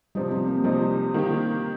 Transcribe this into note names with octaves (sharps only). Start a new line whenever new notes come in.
C3 F3 G3 D#4
C4
A#3
C3 F3 G3 D#4
D#3 A#3 G4